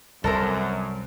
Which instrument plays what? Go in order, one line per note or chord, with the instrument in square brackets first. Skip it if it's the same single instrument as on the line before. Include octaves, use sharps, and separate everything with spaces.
[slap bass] C2 [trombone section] F#2 [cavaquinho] A4 A#4 C5